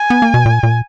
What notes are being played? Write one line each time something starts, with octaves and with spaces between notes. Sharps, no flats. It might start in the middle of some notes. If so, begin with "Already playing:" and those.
Already playing: G#5
B3
A#3
B2
A#2
A#2